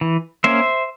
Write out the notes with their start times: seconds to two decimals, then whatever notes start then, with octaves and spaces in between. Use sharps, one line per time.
0.01 E3
0.44 A#3 C#4 C5 E5